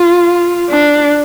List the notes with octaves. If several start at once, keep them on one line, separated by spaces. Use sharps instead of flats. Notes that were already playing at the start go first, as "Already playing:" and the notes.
Already playing: F4
D4